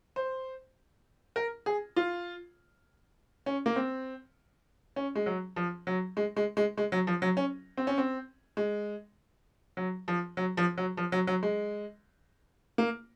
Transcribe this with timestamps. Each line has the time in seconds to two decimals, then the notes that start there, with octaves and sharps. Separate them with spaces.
0.16 C5
1.36 A#4
1.66 G#4
1.96 F4
3.46 C#4
3.66 A#3
3.76 C4
4.96 C#4
5.15 G#3
5.26 F#3
5.56 F3
5.87 F#3
6.17 G#3
6.36 G#3
6.57 G#3
6.77 G#3
6.92 F#3
7.07 F3
7.22 F#3
7.37 C#4
7.77 C4
7.87 C#4
7.98 C4
8.57 G#3
9.77 F#3
10.08 F3
10.37 F#3
10.57 F3
10.78 F#3
10.97 F3
11.12 F#3
11.27 F#3
11.43 G#3
12.78 A#3